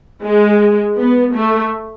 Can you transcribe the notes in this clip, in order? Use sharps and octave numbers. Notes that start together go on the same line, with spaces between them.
G#3
B3
A3